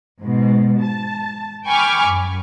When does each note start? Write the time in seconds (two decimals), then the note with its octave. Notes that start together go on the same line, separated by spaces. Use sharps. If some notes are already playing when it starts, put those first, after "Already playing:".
0.21 G#2 B2
0.82 A5
1.67 G5 G#5 B5 C#6 D6 F6
2.08 F#2